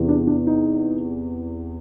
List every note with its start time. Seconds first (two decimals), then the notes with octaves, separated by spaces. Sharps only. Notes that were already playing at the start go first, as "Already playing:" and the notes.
Already playing: E2 C3 E3
0.09 D4
0.27 D4
0.47 D#4